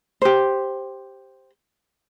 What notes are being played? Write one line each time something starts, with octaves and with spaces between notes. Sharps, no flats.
G4 C5